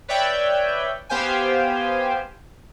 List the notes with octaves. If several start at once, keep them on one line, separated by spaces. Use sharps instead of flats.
B4 C#5 D5 E5 G5
B3 G4 C5 F5 G5 G#5